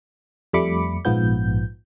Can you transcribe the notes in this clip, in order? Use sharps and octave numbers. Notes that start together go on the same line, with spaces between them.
F2 G3 A3 B5 D6 C#7
A#1 G#2 F3 B3 G6